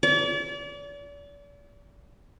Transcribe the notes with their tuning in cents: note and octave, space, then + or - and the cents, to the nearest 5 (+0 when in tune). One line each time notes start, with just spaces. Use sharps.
D5 -40